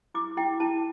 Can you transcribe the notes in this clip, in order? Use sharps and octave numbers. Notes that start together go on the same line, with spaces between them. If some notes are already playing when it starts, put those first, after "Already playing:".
E4 D6
E4 G5
E4 A5